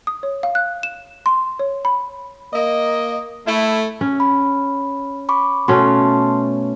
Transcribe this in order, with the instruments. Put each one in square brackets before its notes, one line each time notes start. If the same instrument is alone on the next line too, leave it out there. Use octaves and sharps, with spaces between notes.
[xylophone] D#6
C#5
F5
F#6
E7
C6
C#5
B5
[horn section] A#3 D#5
A3 E4
[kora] C#4
[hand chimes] B5
B5 C#6 D6
[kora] B2 A3 C#4 [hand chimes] A5 C6